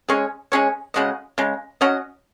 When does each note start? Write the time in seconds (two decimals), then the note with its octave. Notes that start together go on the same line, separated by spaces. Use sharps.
0.09 G#3 C#4 G#4 C#5
0.52 G#3 C#4 G#4 C#5
0.94 C#3 G#3 F#4 D#5
1.38 C#3 G#3
1.81 F#3 C#4 F#4 D#5